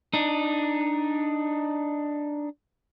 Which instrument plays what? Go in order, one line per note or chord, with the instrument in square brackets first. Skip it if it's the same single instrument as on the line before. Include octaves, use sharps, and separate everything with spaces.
[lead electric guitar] D4 D#4